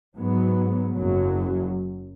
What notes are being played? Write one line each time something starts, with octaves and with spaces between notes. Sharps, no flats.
G#2 F#3 B3
F#1 F#2 F#3